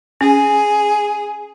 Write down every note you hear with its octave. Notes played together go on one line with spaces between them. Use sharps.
C#4 G#4